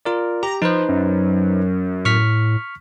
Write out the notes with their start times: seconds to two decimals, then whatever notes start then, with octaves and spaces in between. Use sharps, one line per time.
0.05 F4 A#4 D5
0.43 G4 A#5
0.62 F3 D#4 B4 C5
0.89 F#2
2.05 A2 C#6 F6 B6